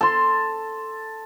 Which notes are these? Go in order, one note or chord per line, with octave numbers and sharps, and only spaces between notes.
A4 C6